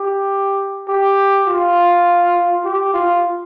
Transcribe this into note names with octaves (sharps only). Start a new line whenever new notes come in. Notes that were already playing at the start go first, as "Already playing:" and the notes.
Already playing: G4
G4
F4
G4
F4